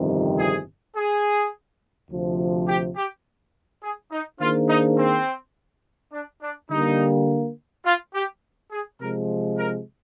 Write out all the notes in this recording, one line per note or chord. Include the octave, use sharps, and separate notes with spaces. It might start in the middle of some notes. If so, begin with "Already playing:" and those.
Already playing: G1 F2 C3 D#3 G3
G#4
G#4
D2 C3 F3
G4
G4
G#4
D#4
D#3 A#3 D4 F4 G#4 C5
D#4
C4
D4
D4
D3 G3 A#3 D#4
F4
G4
G#4
C3 F3 G#3 A#4
A#4